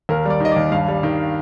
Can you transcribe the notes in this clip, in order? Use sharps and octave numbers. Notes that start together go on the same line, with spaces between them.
D#2 A#4
G3 D5
D#3 D#5
D#2 D5
G2 F5
G3
D#3